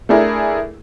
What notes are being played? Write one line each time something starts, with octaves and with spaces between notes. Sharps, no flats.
A3 D4 E4 G#4 A#4